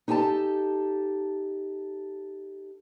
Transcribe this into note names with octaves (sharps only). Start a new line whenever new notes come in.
D#4 G4 A4 G#5 A5